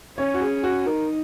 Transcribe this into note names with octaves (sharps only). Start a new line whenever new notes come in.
C#4 C#5
F#4
G#4
F#4
D#4 A#4